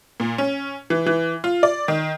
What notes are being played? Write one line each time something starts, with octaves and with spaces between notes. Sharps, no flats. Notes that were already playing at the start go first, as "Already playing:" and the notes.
A#2
C#4
E3
E3
F4
D5
D#3